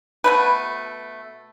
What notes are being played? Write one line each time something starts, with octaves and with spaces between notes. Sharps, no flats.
B2 A3 B4